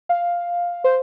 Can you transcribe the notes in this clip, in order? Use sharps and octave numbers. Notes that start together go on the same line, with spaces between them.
F5
C5